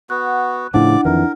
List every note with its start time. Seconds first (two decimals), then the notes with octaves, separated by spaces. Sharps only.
0.10 B3 F#4 F#6
0.74 A2 C#3 F3 D4 E4 D5 F#5 D6
1.05 F2 D#3 E3 A#4